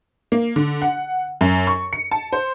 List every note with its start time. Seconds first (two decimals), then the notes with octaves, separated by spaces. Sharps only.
0.32 A#3
0.56 D3
0.82 F#5
1.41 F#2
1.67 C#6
1.93 C#7
2.11 A5
2.33 C5